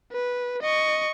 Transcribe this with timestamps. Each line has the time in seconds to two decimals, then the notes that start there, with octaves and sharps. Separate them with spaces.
0.12 B4
0.62 D#5 C#6